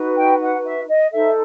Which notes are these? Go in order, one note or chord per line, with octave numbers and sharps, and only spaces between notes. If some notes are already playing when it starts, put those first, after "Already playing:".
Already playing: D#4 F#4 B4
G5
F#5
E5
D#5
D#4 A4 C5 E5